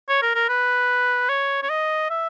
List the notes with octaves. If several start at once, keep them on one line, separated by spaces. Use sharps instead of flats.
C#5
A#4
A#4
B4
C#5
C#5
D#5
E5